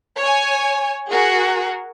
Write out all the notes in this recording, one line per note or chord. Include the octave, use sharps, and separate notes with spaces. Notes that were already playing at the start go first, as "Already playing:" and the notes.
C#5 G#5
F#4 G#4 A#4